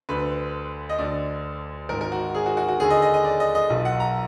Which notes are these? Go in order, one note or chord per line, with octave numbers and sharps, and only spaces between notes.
D2 D3 B4
D#5
D2 D3 D5
G#1 G#2 D#3 A#4
A#4
F#4
G#4
F#4
F#4
F#4
D#2 D3 G#4
D#5
D#5
D#5
D5
D#5
D#5
B1 A#2
F#5
A#5